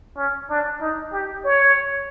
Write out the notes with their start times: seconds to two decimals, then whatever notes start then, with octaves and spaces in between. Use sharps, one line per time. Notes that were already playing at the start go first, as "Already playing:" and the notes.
0.17 C#4
0.50 D4
0.81 D#4
1.12 G4
1.45 C#5